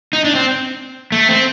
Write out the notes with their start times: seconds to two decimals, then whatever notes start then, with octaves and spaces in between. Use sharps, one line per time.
0.13 D#4
0.24 D4
0.35 C4
1.12 A3
1.29 C4